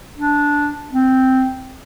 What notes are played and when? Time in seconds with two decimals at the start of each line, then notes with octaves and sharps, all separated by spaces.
0.18 D4
0.92 C4